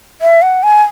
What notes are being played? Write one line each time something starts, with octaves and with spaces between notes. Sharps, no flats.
E5
F#5
G#5